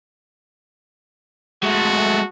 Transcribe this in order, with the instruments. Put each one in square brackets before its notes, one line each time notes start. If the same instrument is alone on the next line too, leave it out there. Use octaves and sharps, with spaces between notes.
[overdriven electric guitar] G#3 A3 [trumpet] F#4